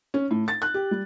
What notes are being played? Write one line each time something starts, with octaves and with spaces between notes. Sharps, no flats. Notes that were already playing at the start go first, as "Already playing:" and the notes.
C#4
A2
A6
F#6
G4
G3